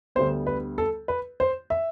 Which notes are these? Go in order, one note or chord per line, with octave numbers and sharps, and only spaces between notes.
D2 D3 G3 B3 C5
B4
A4
B4
C5
E5